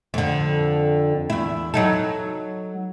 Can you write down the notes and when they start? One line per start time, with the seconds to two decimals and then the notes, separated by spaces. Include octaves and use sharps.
0.14 F2 D3
1.30 E2 E4
1.74 F#3 D#4 A4